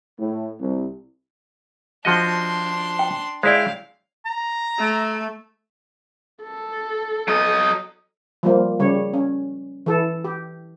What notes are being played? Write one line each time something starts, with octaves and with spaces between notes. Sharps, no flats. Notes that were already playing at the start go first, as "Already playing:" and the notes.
A2
C2
F3 D4 F#4 D#5 C6
G5
G#3 E4 C#5 D5 F5 G5
A#5
A3
A4
F#3 D#5
F3 G3 A#3
C#3 G3 C#5
C#4
E3 A4
G4